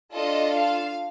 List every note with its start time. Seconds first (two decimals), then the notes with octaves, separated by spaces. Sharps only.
0.13 D4 F4 A4 D#5
0.53 F5